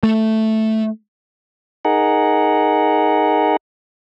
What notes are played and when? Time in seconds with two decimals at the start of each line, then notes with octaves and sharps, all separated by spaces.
0.03 A3
1.85 D#4 G#4 A#4 F#5